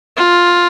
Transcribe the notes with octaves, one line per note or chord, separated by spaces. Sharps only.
F4